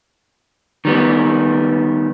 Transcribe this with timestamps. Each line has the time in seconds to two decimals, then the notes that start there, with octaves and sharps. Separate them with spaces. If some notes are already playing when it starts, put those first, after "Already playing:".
0.85 D#3 G3 B3